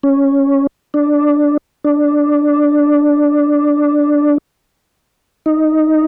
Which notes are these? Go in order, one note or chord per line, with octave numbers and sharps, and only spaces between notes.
C#4
D4
D4
D#4